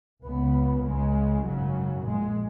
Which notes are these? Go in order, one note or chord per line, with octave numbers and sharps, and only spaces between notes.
C#2 C#3 B3
C#2 C#3 G#3
G#1 F#2 C#3 F#3
A#1 A#2 G#3